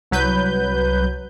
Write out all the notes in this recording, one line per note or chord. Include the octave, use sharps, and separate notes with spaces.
C2 F#3 B4 G6